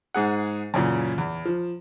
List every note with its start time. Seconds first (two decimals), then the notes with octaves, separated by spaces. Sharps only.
0.14 G#2 G#4 F#5
0.74 F#2 A#2 C#3 E3
1.18 E2
1.45 F3